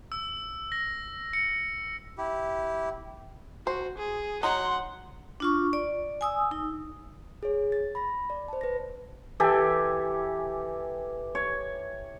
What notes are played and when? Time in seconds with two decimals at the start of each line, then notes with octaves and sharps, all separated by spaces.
0.12 E6
0.72 A#6
1.33 C#7
2.18 E4 G4
3.67 F#4 C5
3.98 G#4
4.43 F#3 D#4 F#5 C6
5.40 D4 F4 C#6
5.73 D5
6.21 G#5 D#6 E6
6.51 D#4
7.43 G#4 C#5
7.72 A6
7.95 B5 A#6
8.30 D5
8.48 C5 A5
8.61 B4 A#6
9.40 E3 G4 A4 G#5
11.35 C#5